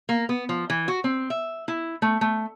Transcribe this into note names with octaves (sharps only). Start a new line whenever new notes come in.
A#3
B3
F3
E3
F#4
C4
E5
E4
A3
A3